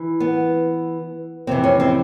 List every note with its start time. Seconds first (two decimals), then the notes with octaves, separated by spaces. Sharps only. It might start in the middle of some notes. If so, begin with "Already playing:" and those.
Already playing: E3
0.20 B3
1.47 F2 C3 E3 C4
1.64 C#4
1.80 C4